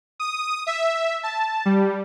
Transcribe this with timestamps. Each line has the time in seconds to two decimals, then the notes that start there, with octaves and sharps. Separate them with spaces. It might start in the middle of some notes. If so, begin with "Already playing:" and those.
0.20 D#6
0.67 E5
1.23 A5
1.65 G3